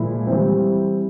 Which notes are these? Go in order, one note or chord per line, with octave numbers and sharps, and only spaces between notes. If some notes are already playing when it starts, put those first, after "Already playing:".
Already playing: A#2 F3 G#3 E4
E3 G3 C4